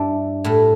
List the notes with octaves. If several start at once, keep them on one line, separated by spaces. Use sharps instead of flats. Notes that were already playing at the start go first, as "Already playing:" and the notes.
Already playing: G2 D4 E4
A2 G3